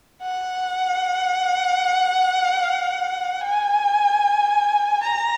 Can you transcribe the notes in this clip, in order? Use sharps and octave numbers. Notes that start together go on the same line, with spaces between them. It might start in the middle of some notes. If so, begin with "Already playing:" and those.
F#5
G#5
A#5